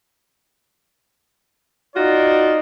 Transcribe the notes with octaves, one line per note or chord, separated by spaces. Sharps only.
D#4 F4 F#4 D5